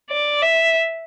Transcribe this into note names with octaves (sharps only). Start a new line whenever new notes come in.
D5
E5